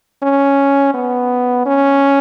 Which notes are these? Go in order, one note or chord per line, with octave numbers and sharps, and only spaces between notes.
C#4
B3
C#4